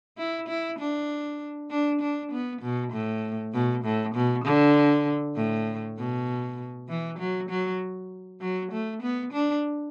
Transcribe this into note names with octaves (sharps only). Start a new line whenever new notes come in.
E4
E4
D4
D4
D4
B3
B2
A2
B2
A2
B2
D3
A2
B2
E3
F#3
F#3
F#3
A3
B3
D4